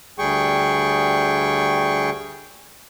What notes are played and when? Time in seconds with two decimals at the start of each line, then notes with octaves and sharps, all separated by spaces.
0.19 D2 G3 G#4 G5 C#6